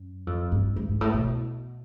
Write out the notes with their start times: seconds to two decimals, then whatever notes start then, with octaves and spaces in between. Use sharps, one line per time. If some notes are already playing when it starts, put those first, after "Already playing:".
Already playing: F#2
0.27 F2
0.52 G2
0.76 G2
0.89 G#2
1.01 A2
1.14 B2